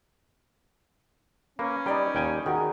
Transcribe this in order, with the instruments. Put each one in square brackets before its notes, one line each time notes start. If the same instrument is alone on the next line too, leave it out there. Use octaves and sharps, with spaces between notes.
[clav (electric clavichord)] A#3 [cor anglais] C#4 [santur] B4
[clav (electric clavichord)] G3 G5 [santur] D#4 D5 B5
[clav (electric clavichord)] D#2 G5 G#5
[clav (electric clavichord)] D#3 [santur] F#4 G#4 [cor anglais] A#4